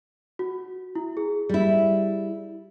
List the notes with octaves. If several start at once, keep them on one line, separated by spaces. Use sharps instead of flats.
F#4
E4
G#4
G3 E4